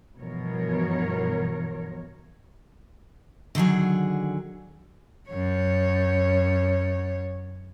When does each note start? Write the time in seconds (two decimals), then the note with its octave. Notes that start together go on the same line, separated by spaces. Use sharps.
0.18 G2 B2 E3 F3 A#4 C#5
3.55 D3 D#3 F#3 G#4
5.30 F#2 C#5